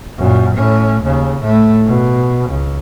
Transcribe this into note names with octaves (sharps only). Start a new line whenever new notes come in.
F#2 A#2
A2 C#4
D#2 C#3
A2 A3
B2
C#2